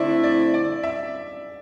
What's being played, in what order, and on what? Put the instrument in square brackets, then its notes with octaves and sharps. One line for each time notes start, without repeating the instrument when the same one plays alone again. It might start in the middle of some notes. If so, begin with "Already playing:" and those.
Already playing: [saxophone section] D3 A3 C4 E4 [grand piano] D5
[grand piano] D5
D5
E5